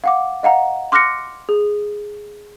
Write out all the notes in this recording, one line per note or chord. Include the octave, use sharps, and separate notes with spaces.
F5 F#5 D6
D#5 F5 F#5 A#5
C6 D6 F6 F#6 A#6 C#7
G#4